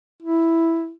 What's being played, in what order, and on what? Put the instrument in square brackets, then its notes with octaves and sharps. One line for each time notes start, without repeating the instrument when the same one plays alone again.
[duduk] E4